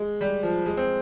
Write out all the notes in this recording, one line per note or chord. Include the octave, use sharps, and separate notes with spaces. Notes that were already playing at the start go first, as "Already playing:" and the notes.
Already playing: G#3
G3
F3
G#3
C4